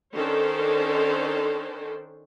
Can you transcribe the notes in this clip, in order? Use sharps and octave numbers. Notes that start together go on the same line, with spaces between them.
D#3 C#4 D4 A4 C5